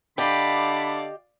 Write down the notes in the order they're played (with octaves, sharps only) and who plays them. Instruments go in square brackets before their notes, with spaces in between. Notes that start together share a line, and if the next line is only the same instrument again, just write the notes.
[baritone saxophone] D3 [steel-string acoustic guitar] G4 D#5 G5 [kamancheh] D5 F5 [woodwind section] B5